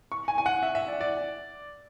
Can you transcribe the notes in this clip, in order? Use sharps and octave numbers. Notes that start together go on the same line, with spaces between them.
C#6
G#5
G#5
F#5
E5
E5
D5
D5